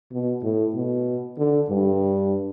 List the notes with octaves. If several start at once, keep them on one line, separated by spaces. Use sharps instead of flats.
B2
A2
B2
D3
G2